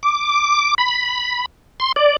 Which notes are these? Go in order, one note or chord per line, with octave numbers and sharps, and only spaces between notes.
D6
B5
C6
D5